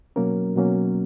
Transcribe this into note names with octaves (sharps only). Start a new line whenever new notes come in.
B2 F#3 A#3 C#4 A#4
B2 F#3 A#3 C#4